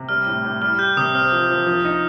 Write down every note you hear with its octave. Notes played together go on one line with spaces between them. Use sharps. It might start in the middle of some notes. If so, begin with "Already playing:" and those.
Already playing: C3
G3 F6
A2
A2
G3 F6
G4 G6
C3 D#6
C4 F6
F3
F3
F3
D#4